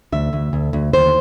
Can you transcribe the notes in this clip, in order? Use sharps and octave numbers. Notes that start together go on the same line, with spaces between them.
D2 E5
D2
D2
D2
D#2 C5